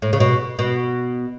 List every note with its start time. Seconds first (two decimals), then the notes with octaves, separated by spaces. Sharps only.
0.02 A2
0.13 C#3
0.20 B2
0.59 B2